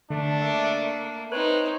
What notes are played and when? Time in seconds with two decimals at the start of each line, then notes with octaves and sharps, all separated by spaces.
0.10 D3 A3 D4
0.42 A#3 E5
1.32 C4 D#4 B4 C#5